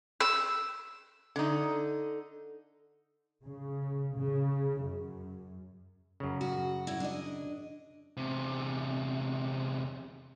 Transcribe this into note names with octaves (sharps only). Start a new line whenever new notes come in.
E6
D3 D#4
C#3
C#3
F#2
F#2 C#3
F#4
F#3 E4
D4 D#5
E2 C3